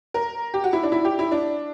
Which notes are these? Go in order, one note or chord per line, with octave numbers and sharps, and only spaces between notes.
A#4
G4
F#4
E4
D4
E4
G4
E4
D4